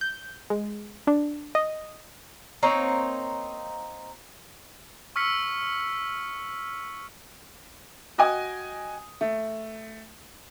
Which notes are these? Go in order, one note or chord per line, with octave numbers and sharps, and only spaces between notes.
G6
G#3
D4
D#5
A#3 C4 D#4 C#5
C#6 E6 F6 B6 C#7
F#4 D#5 G5 G#5 D#6
A3